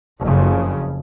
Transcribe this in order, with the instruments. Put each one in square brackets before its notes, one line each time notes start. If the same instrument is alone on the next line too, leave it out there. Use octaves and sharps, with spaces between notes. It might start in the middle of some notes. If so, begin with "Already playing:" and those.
[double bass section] F#1 F2 C#3